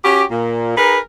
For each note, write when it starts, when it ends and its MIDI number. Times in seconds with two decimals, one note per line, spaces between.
0.05 0.22 61
0.05 0.22 66
0.05 0.22 67
0.30 0.75 46
0.77 0.98 63
0.77 0.98 68
0.77 0.98 70
0.77 0.98 71